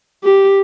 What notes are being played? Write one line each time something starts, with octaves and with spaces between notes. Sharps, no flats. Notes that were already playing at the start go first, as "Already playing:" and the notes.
G4